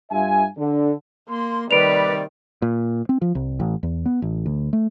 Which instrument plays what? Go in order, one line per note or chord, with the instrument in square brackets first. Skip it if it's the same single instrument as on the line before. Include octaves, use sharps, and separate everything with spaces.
[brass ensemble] G2 F4 E5 G#5
D3
[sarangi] A#3 [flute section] C6
[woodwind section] C3 G3 D5 [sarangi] D#3 [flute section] B4 [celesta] D7 F7
[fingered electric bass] A#2
C4
F3
C2
A1
E2
B3
A1
D2
A3